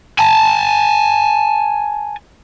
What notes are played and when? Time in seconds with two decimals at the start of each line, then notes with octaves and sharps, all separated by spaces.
0.19 G#5 A5